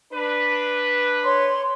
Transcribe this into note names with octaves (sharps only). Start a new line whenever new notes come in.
D4 B4
C#5 C6